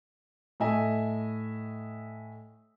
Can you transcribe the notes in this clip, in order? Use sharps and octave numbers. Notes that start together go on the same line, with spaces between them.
A2 A4 D#5 E5 G#5